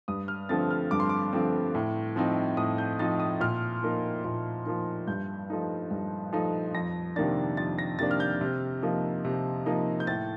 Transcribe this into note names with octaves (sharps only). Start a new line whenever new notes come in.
G2 D#6
F6
D3 F3 A3 C4 A6
F6
G2 D6
C6
D6
D3 F3 A3 C4
A2
F3 C4 D#4
A2 D#6
G6
F3 C4 D#4 A6
D#6
A#2 F6
F3 A#3 D#4
A#2
F3 A#3 D#4
G2 G6
F3 A3 D#4
G2
F3 A3 D#4
F2 A#6
C3 D#3 A#3 D4 A6
F2 A6
A#6
C3 D#3 A#3 D4 A6
F6
G6
C3
F3 A#3 D#4
C3
F3 A#3 D#4
G6
A2 A6